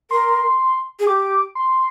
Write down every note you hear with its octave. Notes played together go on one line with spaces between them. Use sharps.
A#4 C6
G#4
G4 D6
C6